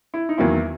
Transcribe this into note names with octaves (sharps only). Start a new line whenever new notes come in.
E4
D#4
E2 D#3 F#3 A#3 E4